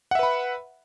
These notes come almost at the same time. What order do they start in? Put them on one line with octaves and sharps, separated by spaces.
F#5 E5 B4 B5